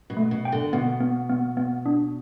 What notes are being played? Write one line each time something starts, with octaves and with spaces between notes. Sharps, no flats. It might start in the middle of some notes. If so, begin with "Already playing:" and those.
B2
A3
B2
G5
D3
B2 B3
B3
B3
B3
D4